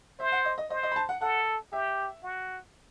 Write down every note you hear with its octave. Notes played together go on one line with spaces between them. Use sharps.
C5 E5
F#5
D#5
D#5
C5 D#5
D#5
B5
A5
F#5
A4 F#5
G4 E5
F#4